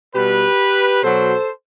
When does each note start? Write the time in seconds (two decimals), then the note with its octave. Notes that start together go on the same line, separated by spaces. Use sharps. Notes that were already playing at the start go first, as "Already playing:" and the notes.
0.15 B2 G3 G4 B4
1.03 B2 F#3 A4 C5